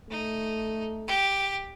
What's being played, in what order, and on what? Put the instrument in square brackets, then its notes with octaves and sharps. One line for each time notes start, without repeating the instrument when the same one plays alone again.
[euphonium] A3 [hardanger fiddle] D#4
[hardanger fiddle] G4